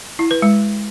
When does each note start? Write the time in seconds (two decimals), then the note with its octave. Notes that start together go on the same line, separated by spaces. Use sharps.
0.19 E4
0.31 B4
0.42 G#3